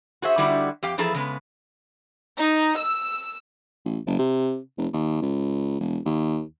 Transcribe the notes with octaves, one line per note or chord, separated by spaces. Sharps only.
F#4 G#4 C5 E5
D3 G3 D#4 E4 F#4 D5
F2 G4 F5 G5
E2 E3 F3 G#4 A4 A#5
C#3 G#3 B3
D#4
E6
A1
F#1
C3
F1
D#2
C#2
E1
D#2